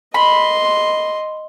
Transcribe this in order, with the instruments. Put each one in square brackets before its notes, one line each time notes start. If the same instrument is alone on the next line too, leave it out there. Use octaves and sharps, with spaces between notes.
[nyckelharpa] D#5 C6 [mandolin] B5